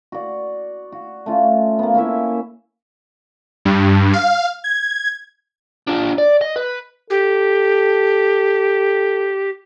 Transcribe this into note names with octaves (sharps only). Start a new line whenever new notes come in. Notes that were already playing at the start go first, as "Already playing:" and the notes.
F#4 D5
F#4
A3 C#4 F4
A#3 B3
A#3 C#4 E4 E5
G2
F5
G#6
D4 F4
D5
D#5
B4
G4 A4